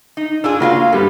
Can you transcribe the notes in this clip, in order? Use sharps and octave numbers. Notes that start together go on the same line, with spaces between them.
D#4
D4 F4 G#4 E6
C#3 A#3 F4 F#4 F5
G2 G3 B3 A4